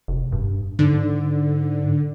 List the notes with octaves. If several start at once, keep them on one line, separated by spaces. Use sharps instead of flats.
F1
G2
G#2 D3